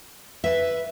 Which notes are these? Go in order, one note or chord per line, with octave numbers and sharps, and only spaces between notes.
B4 E5